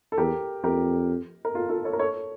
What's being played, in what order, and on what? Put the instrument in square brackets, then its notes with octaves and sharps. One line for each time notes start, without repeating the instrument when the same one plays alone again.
[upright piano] A4
[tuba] E2 [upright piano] G4 A#4
[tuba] F2 [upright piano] G4 A#4
[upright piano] A#4
F4 A4
F4 A4
A4 C#5
A#4
A4 C#5